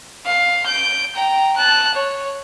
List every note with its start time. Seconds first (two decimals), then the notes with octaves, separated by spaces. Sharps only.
0.26 F5
0.67 G6 D7
1.16 G5 A#5
1.56 A5 F#6
1.95 C#5